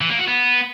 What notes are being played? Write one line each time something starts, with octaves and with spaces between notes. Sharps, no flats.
E3
A#3
F#4
B3